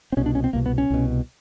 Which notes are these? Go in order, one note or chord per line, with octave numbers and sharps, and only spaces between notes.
C4
C2 B2 C#4
D4
C#4
C4
C2 B2 A#3
B3
C#4
C2 B2